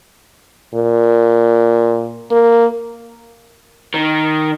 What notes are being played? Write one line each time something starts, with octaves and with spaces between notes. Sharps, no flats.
A#2
A#3
D#3